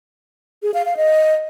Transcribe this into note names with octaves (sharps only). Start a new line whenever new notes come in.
G#4
F5
F5
D#5